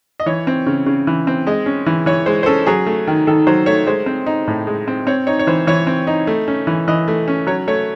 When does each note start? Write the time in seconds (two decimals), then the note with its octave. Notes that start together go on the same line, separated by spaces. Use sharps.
0.20 D#5
0.26 E3 C#5
0.47 C4
0.66 C#3
0.86 C#3
1.07 E3
1.27 C4
1.47 G#3 D#5
1.66 C#4
1.86 E3
2.06 E3 C#5
2.26 G#3 C5
2.43 C5
2.46 C#4 A4
2.67 F#3 G#4
2.87 A3
3.07 D#3
3.27 D#3 A4
3.47 F#3 C5
3.66 A3 C#5
3.87 G#3 C5
4.06 C4
4.26 D#4
4.47 A2
4.67 G#3
4.88 C4
5.07 C4 C#5
5.27 D#4 C#5
5.39 C#5
5.47 E3 C5
5.67 E3 C#5
5.87 C4
6.07 D#4
6.27 A3
6.48 C#4
6.67 E3
6.88 E3 D#5
7.08 A3
7.28 C#4
7.47 F#3 C#5
7.68 A3 C#5